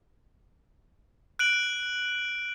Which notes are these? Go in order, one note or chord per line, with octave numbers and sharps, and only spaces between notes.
F#6 D7 F#7